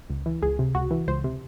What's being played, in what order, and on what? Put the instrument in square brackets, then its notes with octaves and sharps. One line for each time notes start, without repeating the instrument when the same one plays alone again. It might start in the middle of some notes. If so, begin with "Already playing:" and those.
[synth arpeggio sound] C#2
E3
C#2 G#4
C3
C#2 F#4
E3
C#2 C5
C3